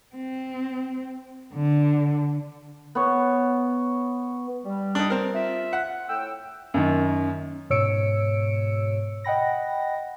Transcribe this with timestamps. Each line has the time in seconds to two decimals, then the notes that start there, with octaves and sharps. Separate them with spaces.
0.16 C4
1.54 D3
2.95 B3 C#5
4.65 G3
4.95 D4 D#4
5.10 C4 A#4
5.35 F4 E5
5.73 F#5
6.09 A2 G5 E6
6.74 F#2 D#3
7.70 G#2 B2 C#5 E6 C#7 D7
9.24 D#5 F#5 G5 B5 A#6